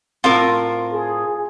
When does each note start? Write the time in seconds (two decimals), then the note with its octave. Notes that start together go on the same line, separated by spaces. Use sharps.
0.24 A2 C4 F4 A#4
0.91 G#4